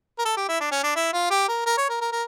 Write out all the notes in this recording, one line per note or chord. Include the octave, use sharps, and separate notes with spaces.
A#4
A4
G4
E4
D4
C#4
D4
E4
F4
G4
A#4
A#4
C#5
A#4
A#4
A#4